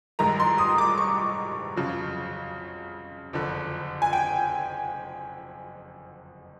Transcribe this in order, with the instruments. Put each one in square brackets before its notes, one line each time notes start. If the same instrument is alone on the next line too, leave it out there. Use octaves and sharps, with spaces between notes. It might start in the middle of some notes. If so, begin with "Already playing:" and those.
[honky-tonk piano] A1 G2 D#3 G#3 A#5
C6
D#6
D6
C#6
F2 C#3 F#3
F#1 F2 D3
G#5
G5